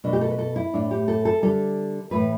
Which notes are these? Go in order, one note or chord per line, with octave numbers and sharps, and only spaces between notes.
B2 A3 D4
G4
A4
B4
A4
E4
A2 A3 D4
G4
A4
A4
D3 G3 A4
A2 E3 A3 B4